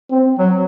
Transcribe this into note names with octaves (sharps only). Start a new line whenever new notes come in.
C4
F#3